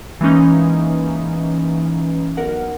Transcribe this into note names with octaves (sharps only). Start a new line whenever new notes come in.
E3 G#3 A#3 C#4 D#4
B1 A#4 F#5